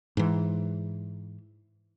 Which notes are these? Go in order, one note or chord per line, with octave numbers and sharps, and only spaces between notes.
G#2 E3